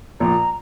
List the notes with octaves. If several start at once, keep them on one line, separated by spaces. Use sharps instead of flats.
A#1 A#2 F3 A#5